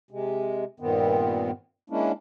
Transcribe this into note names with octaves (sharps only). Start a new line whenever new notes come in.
C3 G#3
G2 A#2 D#3 B3 C4
G#3 A#3 C#4 D4 E4